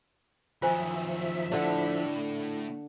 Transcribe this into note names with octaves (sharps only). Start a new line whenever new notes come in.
F#2 D#3 F3 F4 C5 E5 G#5
A2 D3 A3 D4